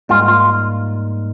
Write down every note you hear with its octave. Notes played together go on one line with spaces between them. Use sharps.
G#2 G3 A#3 D#4 F4
F4